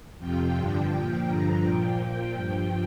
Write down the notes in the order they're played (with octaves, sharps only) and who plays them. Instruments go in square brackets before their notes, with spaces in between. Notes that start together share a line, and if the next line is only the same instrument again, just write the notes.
[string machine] F2 C3 F3 G5
G2 D3 F3 G5
A#2 F3
G2 D3 F3 A#5
A#2 F3 G5
A#2 F3
G2 F3